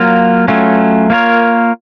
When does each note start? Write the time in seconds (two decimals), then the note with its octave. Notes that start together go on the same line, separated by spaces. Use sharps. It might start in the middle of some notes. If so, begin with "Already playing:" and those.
Already playing: F#3 A#3 F4
0.48 F#3 A3 C#4 F4
1.10 A#3 F4 A#4 C#5